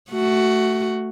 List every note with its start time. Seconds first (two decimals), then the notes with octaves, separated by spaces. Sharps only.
0.11 A3 F#4